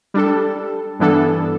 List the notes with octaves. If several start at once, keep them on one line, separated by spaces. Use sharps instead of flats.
G3 D4 A4
G2 E3 B3 D4 A4